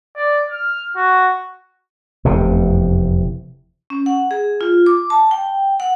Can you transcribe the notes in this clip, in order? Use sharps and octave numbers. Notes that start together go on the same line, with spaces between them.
D5
F6
F#4
F1 E2 C3
C#4
F#5
G#4
F4
D6
A5
G5
F#5